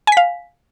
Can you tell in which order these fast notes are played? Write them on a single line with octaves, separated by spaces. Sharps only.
G#5 B6 F5